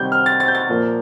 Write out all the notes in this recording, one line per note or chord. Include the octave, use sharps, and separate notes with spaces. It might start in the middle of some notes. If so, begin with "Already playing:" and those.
Already playing: C3 D#3 G3 G6
F6
A6
A6
G6
A6
A#2 F3 A#3